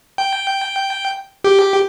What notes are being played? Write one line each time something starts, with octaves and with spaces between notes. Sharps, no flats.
G5
G4